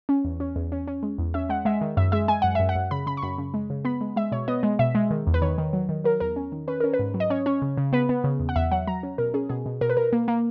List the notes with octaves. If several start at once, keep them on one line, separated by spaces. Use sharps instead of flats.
C#4
E2
C#4
E2
C#4
C#4
G#3
E2
C#4 E5
G#3 F#5
G#3 E5
D#3
F#2 E5
G#3 E5
G#3 G#5
F#2 F#5
F#2 E5
F#5
F#2
C#3 B5
C#3 B5
C#6
F#2 B5
C#3
G#3
C#3
B3 B5
G#3
G#3 E5
B2 C#5
B3 D#5
G#3
B2 E5
G#3
D#3
E2
B4
D#3 C#5
D#3
F#3
D#3
F#3 A#4
E2 A#4
C#4
D#3
C#4 B4
C#4 A#4
B4
G#2
F#3
D#5
C#4 C#5
C#4 C#5
C#3
C#3
B3 B4
B3
C#3
E2
F#5
E2 E5
F#3 F#5
F#3 A#5
C#4
B2 A#4
C#4 G#4
B2 G#4
B2
B2 A#4
B4
B2 A#4
A#3
A#3